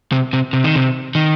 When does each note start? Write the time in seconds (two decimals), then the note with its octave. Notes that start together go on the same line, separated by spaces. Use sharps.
0.12 C3
0.33 C3
0.53 C3
0.64 D#3
0.76 C3
1.15 D#3